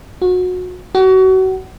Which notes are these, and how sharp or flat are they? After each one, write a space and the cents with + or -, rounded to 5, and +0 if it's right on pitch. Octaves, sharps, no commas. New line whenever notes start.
F#4 -25
F#4 +30